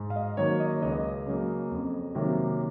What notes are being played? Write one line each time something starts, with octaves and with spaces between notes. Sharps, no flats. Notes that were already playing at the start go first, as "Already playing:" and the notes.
Already playing: G#2
F5
D#5
D#3 F#3 A#3 C#5
D#5
C#2 D#5
C#3 F#3 A#3
F2
C3 D#3 F#3 A#3